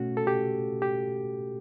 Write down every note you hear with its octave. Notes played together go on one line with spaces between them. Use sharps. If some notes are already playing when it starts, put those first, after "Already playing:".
Already playing: B2 A3 C#4 F#4
A4
G4
G4